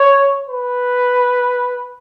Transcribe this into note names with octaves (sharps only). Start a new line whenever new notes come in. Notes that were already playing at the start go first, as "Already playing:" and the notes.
Already playing: C#5
B4